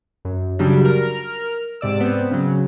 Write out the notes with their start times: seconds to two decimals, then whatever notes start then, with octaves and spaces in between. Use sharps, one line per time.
0.25 F#2
0.59 C#3 F#3 G3 D4
0.85 A#4 F6
1.81 G#2 C3 D5 E6
2.00 B3 C4
2.31 C#3 F#3